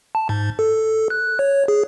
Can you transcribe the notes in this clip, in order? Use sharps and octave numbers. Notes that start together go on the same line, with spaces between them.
A5
G#2
A4
F#6
C#5
G#4